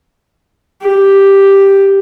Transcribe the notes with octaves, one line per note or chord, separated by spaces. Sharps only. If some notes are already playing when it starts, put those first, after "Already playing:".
G4